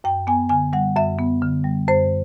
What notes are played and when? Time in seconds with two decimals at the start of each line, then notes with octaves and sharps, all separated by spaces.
0.04 F#2 G5
0.27 B3 G#5
0.49 D3 G#5
0.73 G3 F#5
0.96 F#2 E5
1.18 B3
1.42 D3
1.64 G3
1.87 F#2 C5